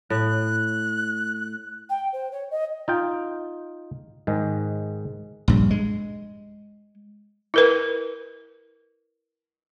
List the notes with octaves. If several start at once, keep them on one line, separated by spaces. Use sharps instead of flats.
A2 F#6
G5
C5
C#5
D#5
D#4 F4 G5
G#2 D#3 G#3
A#1 G2
G#3
E4 A#4 B4